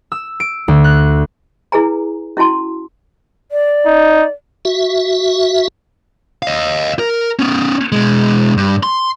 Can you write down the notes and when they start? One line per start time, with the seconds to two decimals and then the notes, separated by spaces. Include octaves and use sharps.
0.12 E6
0.40 D7
0.68 D2
0.84 F#6
1.72 E4 G#4 B4 G#5 A#5
2.37 C#4 E4 F#4 A5 C6
3.52 D5
3.86 D#4
4.65 F#4 E5
6.43 D#5 F5
6.99 A#4
7.39 B3 C#4
7.92 B2 G#3
8.57 G2
8.83 C6